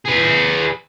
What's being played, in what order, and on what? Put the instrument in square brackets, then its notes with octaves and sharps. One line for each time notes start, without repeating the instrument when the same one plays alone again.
[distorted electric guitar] G#4 B4